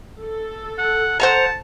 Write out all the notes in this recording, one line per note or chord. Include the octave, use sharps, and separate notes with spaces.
A4
F#5
C5 F#5 A5 A#5